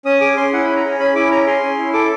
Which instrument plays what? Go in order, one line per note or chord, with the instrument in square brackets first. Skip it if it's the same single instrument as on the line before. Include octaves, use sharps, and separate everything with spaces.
[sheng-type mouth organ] C#4 D#6
G#4 D6
C#4 C6
E4 F#5
C#4 B5
A#5
G#4
C#4 B5
E4 D6
C#4 A#5
G#4 C6
C#4
E4
A4 D6